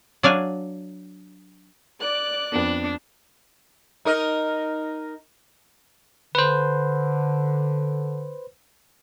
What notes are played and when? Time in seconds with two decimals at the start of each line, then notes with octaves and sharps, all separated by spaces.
0.23 F#3 D4 F5 G#5
2.01 D5 F#6
2.52 F2 B3 D4
4.05 D#4 A#4 D#5
6.35 D3 B4 C5